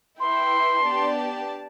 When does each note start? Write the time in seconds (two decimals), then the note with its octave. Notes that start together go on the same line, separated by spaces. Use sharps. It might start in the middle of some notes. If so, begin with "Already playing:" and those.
0.20 E4 B4 E5 G5 C6
0.84 B3 D4 G4 D5 A5